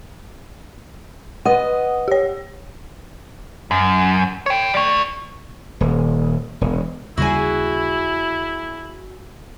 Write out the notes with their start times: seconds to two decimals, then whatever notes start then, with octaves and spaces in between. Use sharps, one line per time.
1.45 B4 D#5 F#5 D#6
2.08 G4 C#5
3.71 F#2
4.46 C#5 G5
4.74 A3 D5
5.81 D#1
6.61 E1
7.17 D#2 C#3 G3 E4 F#4 G#4 G#5